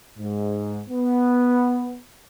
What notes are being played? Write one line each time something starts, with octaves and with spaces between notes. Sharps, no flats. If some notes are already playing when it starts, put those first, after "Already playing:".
G#2
B3